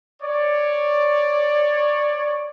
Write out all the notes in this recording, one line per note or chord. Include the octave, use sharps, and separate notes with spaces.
C#5 D5